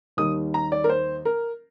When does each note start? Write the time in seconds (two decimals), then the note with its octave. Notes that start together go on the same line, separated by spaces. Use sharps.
0.17 D#2 D#3 G3 D#6
0.54 A#5
0.72 D5
0.84 A#4
0.89 C5
1.25 A#4